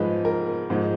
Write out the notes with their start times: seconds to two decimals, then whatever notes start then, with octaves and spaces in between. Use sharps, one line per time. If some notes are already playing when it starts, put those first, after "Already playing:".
Already playing: G#2 F3 G#3 B4
0.25 A#4
0.70 G#2 F3 G#3